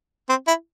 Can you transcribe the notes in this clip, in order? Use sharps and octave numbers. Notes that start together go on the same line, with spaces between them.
C4
E4